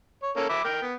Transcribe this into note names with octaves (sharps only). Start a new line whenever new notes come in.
C#5
A#3 C#4 A4
E5 B5 D6
A#4 G5
B3